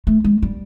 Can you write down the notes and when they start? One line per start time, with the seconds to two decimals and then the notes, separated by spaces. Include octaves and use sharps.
0.07 A3
0.24 G#3
0.42 G3